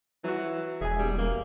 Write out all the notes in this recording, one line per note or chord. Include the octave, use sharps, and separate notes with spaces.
E3 F#3 F#4
E1 G#4 E5 G#5
G3
A#3